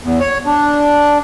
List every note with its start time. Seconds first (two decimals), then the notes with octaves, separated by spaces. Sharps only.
0.03 E2
0.20 C#5
0.46 D4